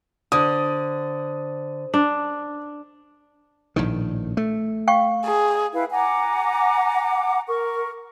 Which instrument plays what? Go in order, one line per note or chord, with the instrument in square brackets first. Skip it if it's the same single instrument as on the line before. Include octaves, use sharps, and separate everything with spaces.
[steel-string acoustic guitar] D3 [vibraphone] C5 [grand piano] D#6
[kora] D4
[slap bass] A#1 A2 D#3
A3
[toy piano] F5 G5 C#6
[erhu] G#4
[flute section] E4 B4 F5 G5
F#5 G#5 A#5 D6
A#4 C#6